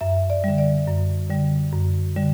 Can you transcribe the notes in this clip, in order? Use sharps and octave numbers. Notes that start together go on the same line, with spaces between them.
F#2 E5
D5
D3 G3
D5
F#2
D3 G3
F#2
D3 G3